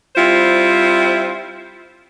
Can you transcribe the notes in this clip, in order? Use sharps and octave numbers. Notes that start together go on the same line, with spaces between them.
G3 C4 E4 F4 C5